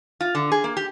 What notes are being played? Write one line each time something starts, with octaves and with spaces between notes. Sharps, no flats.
F4
D3
G#4
A#3
G4